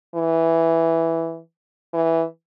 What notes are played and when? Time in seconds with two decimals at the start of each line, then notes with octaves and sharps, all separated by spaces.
0.15 E3
1.93 E3